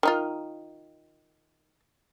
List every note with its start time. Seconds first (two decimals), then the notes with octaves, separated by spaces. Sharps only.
0.03 D#3 D#4 F4